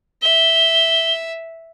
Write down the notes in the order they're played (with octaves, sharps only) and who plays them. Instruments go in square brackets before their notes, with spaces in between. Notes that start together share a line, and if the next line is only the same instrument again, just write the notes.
[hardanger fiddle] E5 [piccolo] G7